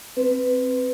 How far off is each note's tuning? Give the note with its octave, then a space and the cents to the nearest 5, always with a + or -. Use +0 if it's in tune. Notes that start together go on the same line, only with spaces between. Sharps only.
C4 +0 B4 +15